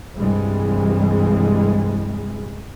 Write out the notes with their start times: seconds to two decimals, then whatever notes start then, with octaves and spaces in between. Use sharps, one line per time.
0.17 C2 G2 E3 G3 G#3